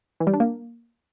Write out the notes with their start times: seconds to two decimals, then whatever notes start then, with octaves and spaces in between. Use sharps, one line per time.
0.20 E3
0.27 G3
0.33 D4
0.40 A#3